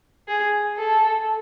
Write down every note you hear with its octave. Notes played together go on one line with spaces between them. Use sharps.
G#4
A4